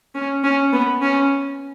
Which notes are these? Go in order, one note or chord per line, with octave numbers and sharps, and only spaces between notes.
C#4
C#4
B3
C#4